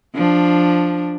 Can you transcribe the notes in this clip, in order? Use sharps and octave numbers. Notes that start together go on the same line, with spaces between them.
F3 D4